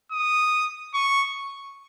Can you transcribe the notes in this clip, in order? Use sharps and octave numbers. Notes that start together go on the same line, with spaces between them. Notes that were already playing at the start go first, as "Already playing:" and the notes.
D#6
C#6